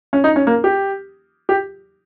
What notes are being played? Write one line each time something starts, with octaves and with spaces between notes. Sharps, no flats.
C#4
D#4
C#4
A#3
G4
G4